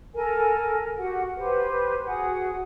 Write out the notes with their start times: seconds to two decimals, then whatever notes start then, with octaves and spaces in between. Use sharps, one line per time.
0.14 A4 A#4 G#5
0.97 F#4 G4 F#5
1.36 G4 B4 C5
2.04 F#4 G#4 F#5